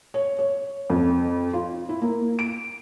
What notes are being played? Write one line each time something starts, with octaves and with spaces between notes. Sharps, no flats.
C#5
C#5
F2
F4
E4
A#3
D7